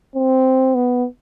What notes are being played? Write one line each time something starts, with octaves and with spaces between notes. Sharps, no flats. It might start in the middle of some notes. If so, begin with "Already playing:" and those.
C4
B3